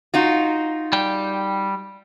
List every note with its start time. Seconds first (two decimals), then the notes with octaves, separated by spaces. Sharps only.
0.14 D#4 F4 F#4
0.93 G3 G5